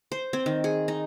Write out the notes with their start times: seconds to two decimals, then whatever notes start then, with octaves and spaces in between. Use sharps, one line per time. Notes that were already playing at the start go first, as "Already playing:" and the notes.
0.12 C5
0.33 C4
0.46 D#3
0.64 G#4
0.88 D#4